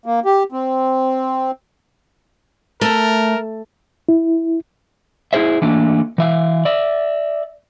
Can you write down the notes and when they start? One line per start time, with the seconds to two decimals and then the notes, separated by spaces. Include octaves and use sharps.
0.06 A#3
0.25 G4
0.52 C4
2.81 A3 A#4
4.09 E4
5.33 E4 F#4 G#4 C5 E5
5.62 E3 A3 A#3 D4
6.18 E3 E5 F5
6.65 D5 E5